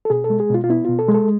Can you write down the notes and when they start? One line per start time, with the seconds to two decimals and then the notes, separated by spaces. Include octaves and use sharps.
0.05 A4
0.10 B2 G#4
0.24 A4
0.30 G#3
0.40 G#4
0.50 B2 F4
0.64 F4
0.69 B3 E4
0.85 B2 F4
0.99 A4
1.09 G#3
1.14 A4